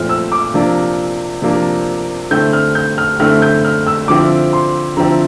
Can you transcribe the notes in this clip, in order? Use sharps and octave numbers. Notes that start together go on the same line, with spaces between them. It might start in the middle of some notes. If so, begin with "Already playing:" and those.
Already playing: A#2 F3 A3 C4 E4 F6
E6
D6
C3 F3 A#3 D4
C3 F3 A#3 D4
D3 A3 C4 E4 G6
F6
G6
F6
D3 A3 C4 E4 F6
G6
F6
E6
D3 F3 C4 E4 D6
C6
D3 F3 C4 E4 A#5